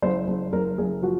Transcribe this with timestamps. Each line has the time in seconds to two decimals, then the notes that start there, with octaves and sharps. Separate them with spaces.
0.02 F#1 C5
0.28 F#1
0.53 F#1 A#4
0.78 F#1 G#4
1.02 F3 F#4